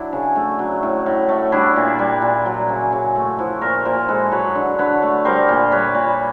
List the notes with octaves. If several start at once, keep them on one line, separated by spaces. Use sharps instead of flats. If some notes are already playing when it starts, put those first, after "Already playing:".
Already playing: F#3 D4 E4
C#3
A3
F#3
A2
A2
A3
G3 D4 E4
A#2
G3
A#2
F#3
C#3
C#3
A3
F3 E4 F#4
A#2 A#4 C5
A#2 A#4 C5
G#3 A4 B4
F#3 B4 C#5
D3
D3 B4 C#5
A3
G3 A#4 C5
A#2
G3 B4 C#5
A#2